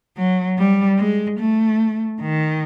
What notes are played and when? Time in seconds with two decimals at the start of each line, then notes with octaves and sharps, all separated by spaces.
0.16 F#3
0.57 G3
0.98 G#3
1.39 A3
2.21 D#3